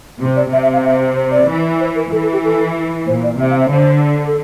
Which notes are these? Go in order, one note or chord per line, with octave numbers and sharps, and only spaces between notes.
C3
D5
C3 E5
E5
F5
E5
C5
D5
E3
C5
A#4
E3 A4
A4
G4
A4
A#2 C5
D5
C3 E5
F5
E5
D3 C5
A4